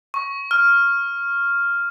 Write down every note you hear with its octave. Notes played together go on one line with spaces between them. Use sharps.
C#6
F6